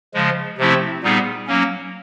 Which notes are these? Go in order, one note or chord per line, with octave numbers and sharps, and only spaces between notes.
C#3 F3 G#3
C3 F3 A3 C4 E4
A#2 G3 B3 D#4 G#4
F#3 A#3 C#4